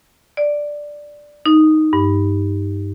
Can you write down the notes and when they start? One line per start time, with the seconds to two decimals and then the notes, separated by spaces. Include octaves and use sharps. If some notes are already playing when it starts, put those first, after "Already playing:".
0.37 D5
1.46 D#4
1.93 G2